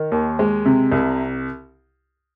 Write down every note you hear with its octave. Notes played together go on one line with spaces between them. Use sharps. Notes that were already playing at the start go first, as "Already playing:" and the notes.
Already playing: D#3
D#2
G#3
C3
C2